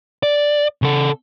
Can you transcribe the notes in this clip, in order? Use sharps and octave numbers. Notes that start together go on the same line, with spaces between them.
D5
C#3 A4